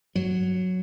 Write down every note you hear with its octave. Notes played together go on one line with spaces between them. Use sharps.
G2 F#3